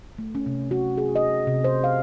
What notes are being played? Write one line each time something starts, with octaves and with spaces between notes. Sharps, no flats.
A3
C#4
C3
F#4
G#4
D#5
C3
C5
F5